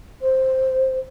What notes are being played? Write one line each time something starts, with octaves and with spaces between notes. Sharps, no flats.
C5